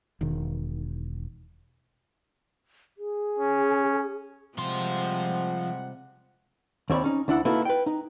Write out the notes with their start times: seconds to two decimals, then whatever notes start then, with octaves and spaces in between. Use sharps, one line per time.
0.21 E1 D#3
2.98 G#4
3.39 C#4
4.58 C3 F3 G3 G#3 F#5 C6
6.90 D#2 C4 C#5 D5 B5
7.04 C#4 D#4
7.28 D2 D4 E4 F#5
7.45 A#3 D#4 E4 F#4 A4 B4
7.65 B4 G5
7.86 D#4